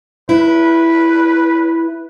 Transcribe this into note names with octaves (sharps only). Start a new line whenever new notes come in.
E4 B4